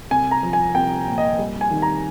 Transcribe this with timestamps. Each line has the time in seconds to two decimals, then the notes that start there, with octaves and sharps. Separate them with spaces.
0.11 C2 G#5
0.31 A#5
0.43 F3
0.53 G#5
0.75 C2 G5
1.07 A#2
1.18 D#5
1.39 G3
1.61 G#5
1.71 D#3
1.82 A#5